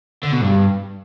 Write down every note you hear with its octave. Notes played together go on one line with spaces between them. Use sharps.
D3
B2
G2